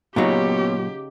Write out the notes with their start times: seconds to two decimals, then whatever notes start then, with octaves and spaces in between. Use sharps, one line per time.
0.16 A#2 C#3 F#3 B3 D#4 F#4 G4 C#5